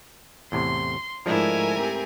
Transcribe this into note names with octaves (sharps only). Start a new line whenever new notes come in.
E2 A2 C3 C6
G#2 F3 G#3 A3 D4 E4 A#4 G#5
C4 G4